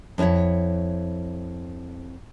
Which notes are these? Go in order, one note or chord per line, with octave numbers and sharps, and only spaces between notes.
F2 C#4 E4 C#5 F#5